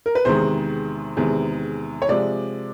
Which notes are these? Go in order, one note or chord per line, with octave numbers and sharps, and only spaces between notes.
A#4
B4
E2 C3 D#3 G#3 C5
E2 C3 D#3 G#3
C#5
C3 F3 G#3 D5